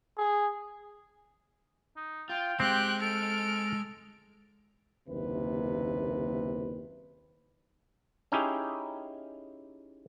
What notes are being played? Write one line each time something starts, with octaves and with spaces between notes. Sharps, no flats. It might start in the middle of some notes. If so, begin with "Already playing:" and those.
G#4
D#4
F4 G5
G#3 C4 G4 G5 F#6
A4 F6 D7
F#1 D#2 C3 B4
C#4 D#4 E4 G4 G#4